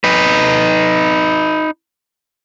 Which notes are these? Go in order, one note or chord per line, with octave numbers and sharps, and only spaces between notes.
D#4 B4